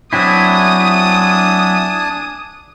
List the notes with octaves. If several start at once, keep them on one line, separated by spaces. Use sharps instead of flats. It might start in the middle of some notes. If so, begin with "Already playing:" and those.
F#3 C4 D4 E4 G#5 A5 D#6